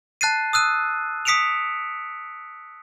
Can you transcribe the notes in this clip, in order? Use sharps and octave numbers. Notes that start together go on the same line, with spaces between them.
A5 F#6 A6 C7 D#7
D#6 E6 F#6 D#7
D#6 B6 C#7 D7 E7 F7